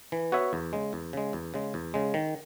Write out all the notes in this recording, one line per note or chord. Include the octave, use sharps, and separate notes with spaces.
E3
B3 F#4 C#5 E5
E2
C#3 G#3
E2
C#3 G#3
E2
C#3 G#3
E2
C#3 G#3
D#3